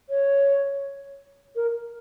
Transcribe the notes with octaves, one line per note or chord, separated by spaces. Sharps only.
C#5
A#4